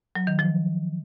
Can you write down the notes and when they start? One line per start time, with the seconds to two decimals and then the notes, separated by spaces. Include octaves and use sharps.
0.15 F#3
0.27 D#3
0.39 F3